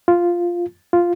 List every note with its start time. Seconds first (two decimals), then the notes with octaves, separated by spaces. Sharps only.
0.08 F4
0.93 F4